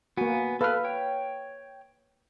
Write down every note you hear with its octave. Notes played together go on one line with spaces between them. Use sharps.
A#3 B3 F#4 G#5
A4 B4 F5 F6
C#5 G5